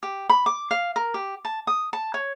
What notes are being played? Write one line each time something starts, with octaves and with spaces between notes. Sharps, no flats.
G4
B5
D6
F5
A#4
G4
A5
D#6
A5
C#5